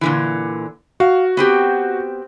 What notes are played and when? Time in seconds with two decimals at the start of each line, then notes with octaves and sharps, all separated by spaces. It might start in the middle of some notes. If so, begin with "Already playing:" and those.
0.01 A#2 D3 E3
1.00 F#4 F5
1.37 B3 C4 G4